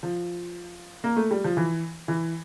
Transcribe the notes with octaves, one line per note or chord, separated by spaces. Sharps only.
F3
A#3
A3
G3
F3
E3
E3